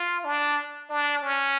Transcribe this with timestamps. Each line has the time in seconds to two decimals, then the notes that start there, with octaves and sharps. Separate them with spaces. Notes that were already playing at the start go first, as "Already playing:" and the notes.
Already playing: F4
0.25 D4
0.90 D4
1.22 C#4